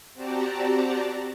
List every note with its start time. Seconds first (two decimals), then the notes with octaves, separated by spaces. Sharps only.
0.14 C4 F#4 G4 D5 A5 A#5